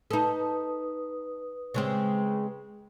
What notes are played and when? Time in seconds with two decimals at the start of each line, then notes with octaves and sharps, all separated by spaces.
0.11 D#4 A4 B4 D#6
1.74 C#3 G#3 C4